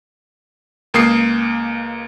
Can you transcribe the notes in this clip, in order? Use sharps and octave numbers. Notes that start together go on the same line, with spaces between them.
C#2 A#3 D#6 C7